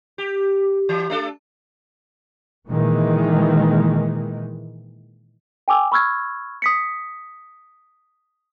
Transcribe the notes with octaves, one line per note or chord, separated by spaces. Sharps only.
G4
E3
A3 D4 A4
A#2 D#3 E3 G#3
G5 G#5 D6 E6
B5 C#6 E6 F6 G#6
D#6 B6 C#7